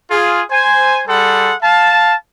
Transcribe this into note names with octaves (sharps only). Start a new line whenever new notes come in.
F4 G#4
C5 G#5
G3 G#4 A4 F#5 C6
F5 A5